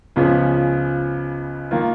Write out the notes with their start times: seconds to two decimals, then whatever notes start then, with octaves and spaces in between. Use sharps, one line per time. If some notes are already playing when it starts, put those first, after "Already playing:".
0.16 C#2 C#3 F3 B3
1.71 D#3 A#3 F4